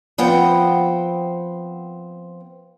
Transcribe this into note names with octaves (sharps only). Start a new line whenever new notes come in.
F3 B3 C4 F#5 G5